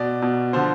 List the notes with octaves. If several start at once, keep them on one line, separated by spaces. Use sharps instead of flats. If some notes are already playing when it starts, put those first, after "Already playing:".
Already playing: B2 D5
B2
D3 F3 C5